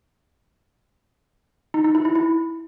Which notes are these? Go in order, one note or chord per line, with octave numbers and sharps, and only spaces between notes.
D#4
D#4
E4
E4
E4